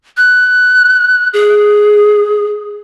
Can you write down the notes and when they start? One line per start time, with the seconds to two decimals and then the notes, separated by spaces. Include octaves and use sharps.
0.17 F#6
1.33 G#4